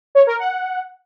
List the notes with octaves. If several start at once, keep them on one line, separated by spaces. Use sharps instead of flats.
C#5
A#4
F#5